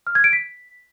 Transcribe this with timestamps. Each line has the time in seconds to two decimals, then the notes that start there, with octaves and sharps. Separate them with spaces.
0.07 F6
0.15 G#6
0.24 D7
0.33 B6